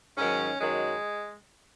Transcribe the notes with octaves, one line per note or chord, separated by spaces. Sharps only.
G#2 D#3 F#3 C#4
F#2 D#3 F#3 G#3